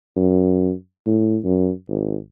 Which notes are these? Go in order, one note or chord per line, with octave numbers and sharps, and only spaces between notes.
F#2
A2
F#2
G#1